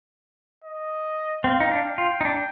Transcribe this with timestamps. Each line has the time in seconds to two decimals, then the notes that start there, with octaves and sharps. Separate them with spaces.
0.64 D#5
1.44 C4 F5
1.60 D#4
1.71 D4
1.85 G5
1.98 F4
2.21 D#4
2.25 D4